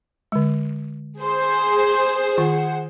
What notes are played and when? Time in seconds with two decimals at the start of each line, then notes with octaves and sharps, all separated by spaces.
0.32 D3 G#3
1.21 G#4 C5 C6
2.37 D#3 F4 F#5